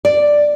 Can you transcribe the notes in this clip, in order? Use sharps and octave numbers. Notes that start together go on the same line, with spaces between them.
D5